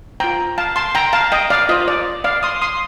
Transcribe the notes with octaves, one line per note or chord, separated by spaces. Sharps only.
F4 C5 G5 A#5
F5 A5
A5 C6
G5 A#5
F5 A5
D#5 G5
D5 F5
F4 C5 D#5
D5
D5 F5
C6 D#6
C6 D#6